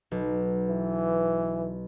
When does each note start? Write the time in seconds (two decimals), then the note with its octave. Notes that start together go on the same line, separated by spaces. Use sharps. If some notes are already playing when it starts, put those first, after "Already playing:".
0.11 B1
0.69 E3